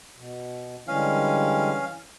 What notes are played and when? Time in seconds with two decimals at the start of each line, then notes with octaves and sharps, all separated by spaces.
0.17 B2
0.88 D3 E3 G3 G#3 C#4 F5